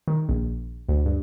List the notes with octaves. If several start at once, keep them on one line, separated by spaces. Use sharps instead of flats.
D#3
A#1
D2
G2